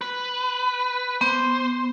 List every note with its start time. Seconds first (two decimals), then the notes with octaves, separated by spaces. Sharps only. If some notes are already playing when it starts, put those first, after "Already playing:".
0.01 B4
1.21 B3 C5